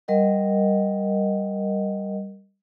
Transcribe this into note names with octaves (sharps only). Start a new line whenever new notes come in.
G3 A#4 D#5 F#5